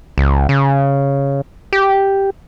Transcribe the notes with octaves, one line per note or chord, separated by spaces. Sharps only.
C#2
C#3
G4